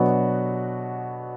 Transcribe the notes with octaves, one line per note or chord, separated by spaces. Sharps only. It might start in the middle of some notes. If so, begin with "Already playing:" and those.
Already playing: B2 F#3 B3 D4 F#4